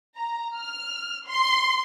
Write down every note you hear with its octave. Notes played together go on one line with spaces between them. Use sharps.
A#5
F6
C6